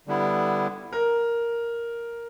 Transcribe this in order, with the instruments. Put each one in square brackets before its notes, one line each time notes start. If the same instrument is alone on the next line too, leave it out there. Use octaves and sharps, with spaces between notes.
[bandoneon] D3 G3 B3 E4
[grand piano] A#4